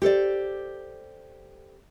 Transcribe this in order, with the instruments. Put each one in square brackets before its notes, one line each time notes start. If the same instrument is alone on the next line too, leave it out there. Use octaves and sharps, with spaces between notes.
[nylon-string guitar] G4 A4 C5 D5